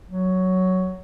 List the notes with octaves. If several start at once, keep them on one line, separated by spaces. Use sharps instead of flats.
F#3